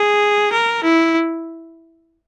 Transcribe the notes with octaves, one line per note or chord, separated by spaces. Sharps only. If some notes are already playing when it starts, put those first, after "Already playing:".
Already playing: G#4
A#4
E4